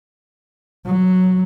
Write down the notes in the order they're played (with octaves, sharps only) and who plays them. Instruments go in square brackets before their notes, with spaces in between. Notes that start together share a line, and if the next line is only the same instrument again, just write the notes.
[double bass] F#3